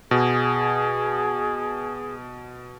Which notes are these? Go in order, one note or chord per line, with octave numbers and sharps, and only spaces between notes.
B2 G#4